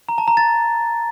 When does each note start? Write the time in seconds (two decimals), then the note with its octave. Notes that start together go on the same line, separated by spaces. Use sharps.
0.09 A#5
0.18 A5
0.28 A#5
0.37 A6